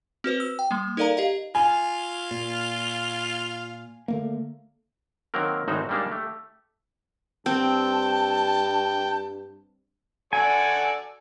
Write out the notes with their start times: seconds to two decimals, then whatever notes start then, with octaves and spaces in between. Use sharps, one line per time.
0.24 C4 F#4 B4 C5
0.40 E6
0.59 G5
0.71 G3 A#3
0.97 D#4 A4 A#4 D5 F5 A#5
1.17 G4 D#5 F5
1.55 F4 G#5
2.31 A#2
4.08 D3 A3 A#3
5.34 D#3 F#3 A#3 C4 A#4
5.68 G#1 A2 D#4 F#4 G#4 C5
5.89 G3 G#3 A#3 D4 D#4
6.09 A3 G4
7.46 G2 C4 G5 A5
10.33 F#4 A4 D5 G#5